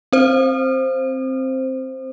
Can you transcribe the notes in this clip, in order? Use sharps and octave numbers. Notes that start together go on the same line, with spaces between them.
C4 C5